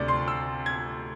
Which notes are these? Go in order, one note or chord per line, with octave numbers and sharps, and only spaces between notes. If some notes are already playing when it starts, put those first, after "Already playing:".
Already playing: D2 C3 D5
C6
E6
G#6